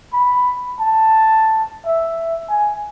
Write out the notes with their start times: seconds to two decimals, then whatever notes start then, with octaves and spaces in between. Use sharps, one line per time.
0.13 B5
0.80 A5
1.86 E5
2.49 G#5